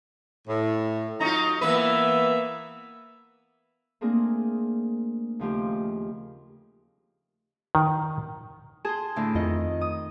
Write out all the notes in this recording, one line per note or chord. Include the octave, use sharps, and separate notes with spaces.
A2
F#3 D#4 F4 C#5 A#5
E3 A#3 B3 B4 E5
A3 A#3 C4 D4 G#4 A#4
D#2 C#3 F3 A3 G4 C5
D#3
G#4 A5 C6
A2 D3
F2 D#3 F4 D#5
D#6